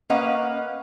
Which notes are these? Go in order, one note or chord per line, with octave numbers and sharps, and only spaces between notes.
A#3 C#4 B4 D#5 F5 F#5